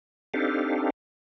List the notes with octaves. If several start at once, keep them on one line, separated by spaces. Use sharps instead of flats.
C4 D4 D#4 G4 A4 F5